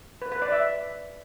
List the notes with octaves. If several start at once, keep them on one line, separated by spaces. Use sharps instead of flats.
B4
B4
D5
E5